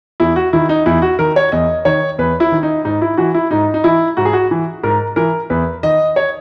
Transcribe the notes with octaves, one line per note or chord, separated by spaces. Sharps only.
E2 E4
F#4
D#3 E4
D#4
E2 E4
F#4
D#3 A#4
C#5
E2 D#5
D#3 C#5
E2 B4
E4
D#3
D#4
G#2 D#4
E4
E3 F#4
E4
G#2 D#4
D#4
E3 E4
G#2 F#4
G#4
F#4
E3
G#2 A#4
E3 A#4
E2 B4
D#3 D#5
C#5